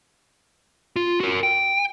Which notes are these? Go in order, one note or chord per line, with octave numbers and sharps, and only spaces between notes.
F4
F#4 A#4
G5